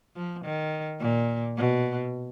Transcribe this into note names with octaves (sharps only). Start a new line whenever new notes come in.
F3
D#3
A#2
B2